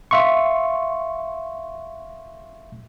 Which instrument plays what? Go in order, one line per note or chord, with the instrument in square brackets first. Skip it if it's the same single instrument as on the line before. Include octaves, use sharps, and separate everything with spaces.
[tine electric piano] E5 F5 C6 C#6